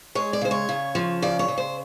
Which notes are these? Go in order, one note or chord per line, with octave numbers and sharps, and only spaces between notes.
G#3 C#5
D5
C#3 C5
C#5
C#3
F3
C#3 D5
C#5
C#3
C5